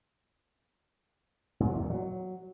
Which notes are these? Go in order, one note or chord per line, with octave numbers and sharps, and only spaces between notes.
G#2
F#3
E2
A#2
F#3